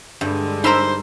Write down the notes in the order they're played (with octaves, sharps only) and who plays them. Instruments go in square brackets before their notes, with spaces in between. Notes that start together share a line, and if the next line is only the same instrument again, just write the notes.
[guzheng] G2 [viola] D3 G#3
[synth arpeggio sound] D#4 B5 E6 [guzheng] A#4 C6 [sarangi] C5